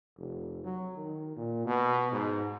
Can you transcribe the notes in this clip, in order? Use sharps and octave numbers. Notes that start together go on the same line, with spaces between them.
F1
F#3
D#3
A#2
B2
G#2